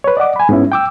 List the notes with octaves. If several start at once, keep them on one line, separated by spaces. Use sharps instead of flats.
B4 C#5
D5 D#5 F#5 D6
G#5 B5
G#2 B3 C#4 E4
G5 D6 E6